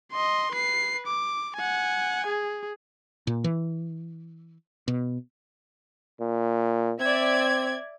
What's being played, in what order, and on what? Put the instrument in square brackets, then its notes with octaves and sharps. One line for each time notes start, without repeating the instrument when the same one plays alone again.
[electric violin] D#5 C6
B4 C7
D6
F#5 G#5
G#4
[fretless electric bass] A#2
E3
B2
[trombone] A#2
[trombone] C4 [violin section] D5 E5 G#6